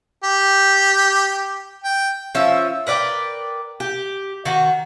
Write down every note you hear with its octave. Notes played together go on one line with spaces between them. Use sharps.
G4
G5
F3 C#4 E5
A#4 B4 D5 G5
G4
D#3 F#4